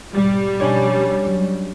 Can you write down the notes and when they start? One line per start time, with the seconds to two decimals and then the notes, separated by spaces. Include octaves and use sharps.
0.14 B1 G#2 G3
0.60 B2 F3 C#4 D4 C#5
1.27 F#3